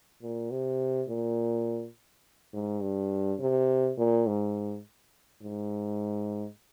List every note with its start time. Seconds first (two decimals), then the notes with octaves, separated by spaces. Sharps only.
0.22 A#2
0.51 C3
1.09 A#2
2.53 G#2
2.82 G2
3.39 C3
3.97 A#2
4.27 G#2
5.42 G#2